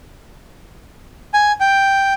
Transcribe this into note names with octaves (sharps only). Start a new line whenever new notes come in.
G#5
G5